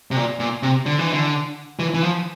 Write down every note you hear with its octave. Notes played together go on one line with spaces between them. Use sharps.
C3
A#2
A#2
C3
D3
E3
D3
E3
E3
F3